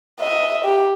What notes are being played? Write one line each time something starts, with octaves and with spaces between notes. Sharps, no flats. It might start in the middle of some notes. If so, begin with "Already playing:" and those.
D#5 E5
G4